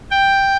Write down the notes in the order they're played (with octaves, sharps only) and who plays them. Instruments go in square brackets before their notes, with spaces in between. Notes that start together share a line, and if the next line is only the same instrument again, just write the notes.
[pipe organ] G5